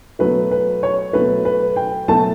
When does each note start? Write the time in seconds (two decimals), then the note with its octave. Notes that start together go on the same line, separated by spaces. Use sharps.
0.19 B2 F#3 A3 B4
0.51 B4
0.83 C#5
1.13 B2 F#3 A3 B4
1.45 B4
1.76 G5
2.08 B2 F#3 A3 A5